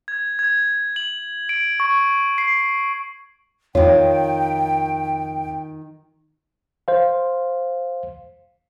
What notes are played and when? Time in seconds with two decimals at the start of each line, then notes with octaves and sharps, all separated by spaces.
0.08 G#6
0.39 G#6
0.96 F#7
1.49 D7
1.80 C#6
2.38 C7
3.75 F2 D#3 F4 C#5 G5
6.88 C5 F5